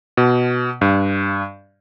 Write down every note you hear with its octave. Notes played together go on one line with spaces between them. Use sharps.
B2
G2